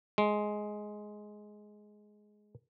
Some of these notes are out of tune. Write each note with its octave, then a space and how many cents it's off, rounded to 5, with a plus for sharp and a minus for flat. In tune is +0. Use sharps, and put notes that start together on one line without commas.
G#3 +10